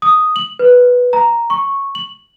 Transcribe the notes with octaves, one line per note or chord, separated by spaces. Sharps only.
D#6
F#7
B4
A#5
C#6
F#7